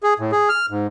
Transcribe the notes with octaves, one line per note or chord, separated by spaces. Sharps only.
G#4
A2
G#4
F6
G#2